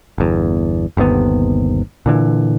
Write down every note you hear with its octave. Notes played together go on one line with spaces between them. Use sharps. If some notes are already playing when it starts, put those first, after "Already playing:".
G1 E2
G1 D#2 C3 B3
A#2 D3 E3